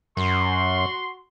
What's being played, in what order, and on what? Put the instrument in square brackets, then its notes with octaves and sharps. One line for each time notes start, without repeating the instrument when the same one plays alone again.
[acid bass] F#2 [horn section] F#4 C6